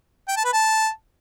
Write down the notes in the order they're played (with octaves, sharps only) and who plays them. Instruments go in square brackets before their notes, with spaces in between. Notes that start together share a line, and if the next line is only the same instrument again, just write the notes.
[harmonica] G5
A5
B4
A5